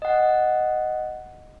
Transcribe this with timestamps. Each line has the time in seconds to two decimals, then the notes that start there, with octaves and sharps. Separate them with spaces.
0.02 D#5 F#5